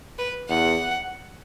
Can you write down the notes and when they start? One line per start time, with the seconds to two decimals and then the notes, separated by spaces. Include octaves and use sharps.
0.18 B4
0.49 E2 F#5